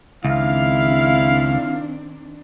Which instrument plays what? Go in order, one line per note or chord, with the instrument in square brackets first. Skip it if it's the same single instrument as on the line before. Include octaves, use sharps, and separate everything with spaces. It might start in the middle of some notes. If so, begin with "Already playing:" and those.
[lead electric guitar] C#2 [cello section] D#3 C4 D4 [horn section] E4 F5